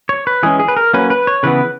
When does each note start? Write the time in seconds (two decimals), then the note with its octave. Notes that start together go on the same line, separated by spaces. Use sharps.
0.09 C#5
0.27 B4
0.43 E3 G#3 C#4 G#4
0.60 G#4
0.68 B4
0.77 A#4
0.93 F#3 A#3 C#4 B4
1.10 B4
1.27 C#5
1.43 C#3 E3 B3 B4